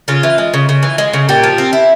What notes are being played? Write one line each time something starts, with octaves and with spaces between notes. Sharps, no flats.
C#3 F4
E3
G#3
C#3
C#3
E3
G#3
C#3
A#2 G4
F3
C4
E4